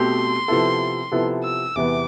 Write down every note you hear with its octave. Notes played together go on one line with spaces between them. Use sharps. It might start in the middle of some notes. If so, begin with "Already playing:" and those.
Already playing: B2 A3 C4 G4 C6
C3 F3 B3 E4 A4
C3 F3 B3 E4 A4
E6
E2 C3 E3 B3 D6